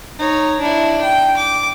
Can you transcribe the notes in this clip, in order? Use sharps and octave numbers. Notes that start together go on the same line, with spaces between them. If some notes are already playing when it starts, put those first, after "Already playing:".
D#4 C#5
D4 E4
G5
D6